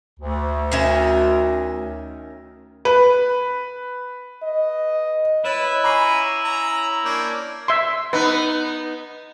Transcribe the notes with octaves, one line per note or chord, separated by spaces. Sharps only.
D2
D#3 C#4 E5
B4
D#5
E4 B4 C#5 D#5 A6
C#4 A#5 B5 D6 C7 D#7
C#4 A#5
A#3 C#4 D4 G6 G#6
E5 C6
B3 D#4 B4